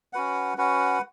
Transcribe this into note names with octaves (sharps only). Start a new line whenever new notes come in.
C#4 F#4 B4 F#5
C#4 F#4 B4 F#5